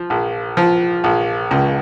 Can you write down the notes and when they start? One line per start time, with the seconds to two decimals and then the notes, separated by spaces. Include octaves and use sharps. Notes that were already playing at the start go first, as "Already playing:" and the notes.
Already playing: F3
0.10 A#1
0.57 F3
1.04 A#1
1.51 C#2